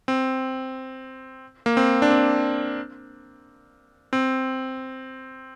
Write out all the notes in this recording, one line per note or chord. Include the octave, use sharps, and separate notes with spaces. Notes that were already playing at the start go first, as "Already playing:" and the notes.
C4
A#3
C4
D4
C4
C4